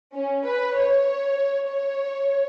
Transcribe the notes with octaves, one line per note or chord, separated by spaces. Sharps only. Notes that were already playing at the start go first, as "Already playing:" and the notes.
C#4
B4
C#5
C#5